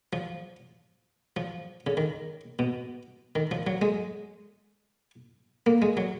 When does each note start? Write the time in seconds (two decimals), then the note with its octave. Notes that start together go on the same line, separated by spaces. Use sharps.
0.13 F3
1.37 F3
1.87 C#3
1.97 D#3
2.59 B2
3.35 D#3
3.51 F3
3.67 F#3
3.82 G#3
5.66 A#3
5.82 G#3
5.97 F#3